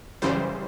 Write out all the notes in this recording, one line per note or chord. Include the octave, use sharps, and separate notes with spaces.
F#2 C#3 E3 G3 C5